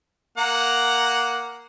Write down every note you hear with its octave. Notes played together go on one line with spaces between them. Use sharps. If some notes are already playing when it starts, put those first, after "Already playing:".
A#3 F#5 A#5